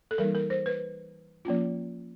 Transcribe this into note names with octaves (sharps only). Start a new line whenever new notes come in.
A4
E3 G3 A#3 D#4 A#4
A#4
C5
B4
F3 A#3 C#4 F4